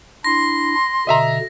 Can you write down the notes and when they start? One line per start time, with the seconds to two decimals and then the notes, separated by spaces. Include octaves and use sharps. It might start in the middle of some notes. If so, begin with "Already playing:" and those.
0.24 D4 E4 C6 A#6
1.07 B2 D3 D#5 E5 A#5